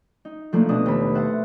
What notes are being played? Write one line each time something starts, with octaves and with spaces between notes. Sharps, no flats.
D#4
F3 A3 A#3 D4
B2 D4 D#6
D#2 B5
C5 E5 F#5 A5